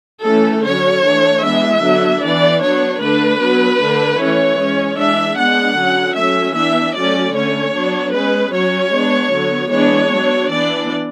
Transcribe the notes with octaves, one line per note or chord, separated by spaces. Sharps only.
E3 A3 C#4 A4
D3 F#3 C#4 C#5
E3 A3 D4
E3 G#3 B3 D4 E5
D3 F#3 B3 D4
E3 B3 D4 D5
F#3 B3 D4 C#5
D3 A3 D4 B4
F#3 B3 D4
D3 A3 D4
E3 A3 C#4 C#5
G#3 C#4
E3 G#3 D4 E5
G#3 B3 D4 F#5
D3 F#3 C#4
F#3 A3 C#4 E5
E3 B3 D4 E5
F#3 A3 C#4 D5
D3 A3 C#4 C#5
F#3 B3 D4
G#3 C#4 B4
F#3 C#4 C#5
G#3 B3 D4
D3 F#3 B3
E3 G#3 B3 D4 C#5
F#3 B3 D4
E3 B3 D4 D5